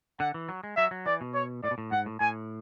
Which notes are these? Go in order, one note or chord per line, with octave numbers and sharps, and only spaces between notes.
D3 F#5
E3
F#3
G#3
F#3 E5
F#3
E3 D5
B2
C#5
A2 D5
B2
A2
G#2 F#5
A2
A2 G#5